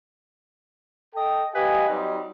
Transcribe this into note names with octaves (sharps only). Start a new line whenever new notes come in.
A4 D#5 G5
G4 B4 D#5 F5 G#5
F#3 G3 C4 D#4